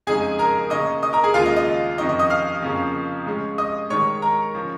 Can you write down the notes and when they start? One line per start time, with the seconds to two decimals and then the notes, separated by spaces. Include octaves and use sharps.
0.07 F2 C#3 G#3 D#4 G#4 G#5
0.39 A#4 A#5
0.70 C#3 A#3 C#4 D#5 D#6
1.03 D#5 D#6
1.13 A#4 A#5
1.24 G#4 G#5
1.34 D#2 C#3 G#3 F4 F5
1.46 D#5
1.56 D#5
1.98 F2 D#3 C#4 D#5
2.09 D#5
2.19 D#5 D#6
2.30 F5 F6
2.62 F2 C#3 F3 A#3 C#4
3.26 G#2 G#3 C#4
3.58 D#5 D#6
3.90 G#2 D#3 G#3 C#5 C#6
4.22 A#4 A#5
4.55 F3 C#4